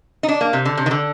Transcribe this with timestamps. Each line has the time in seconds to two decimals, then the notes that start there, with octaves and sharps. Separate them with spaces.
0.23 D#4
0.28 D4
0.41 A#3
0.53 C3
0.65 D3
0.78 C3
0.86 D#3
0.91 D3